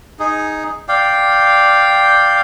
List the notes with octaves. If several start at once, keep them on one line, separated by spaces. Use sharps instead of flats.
D#4 G#4
D5 F5 G5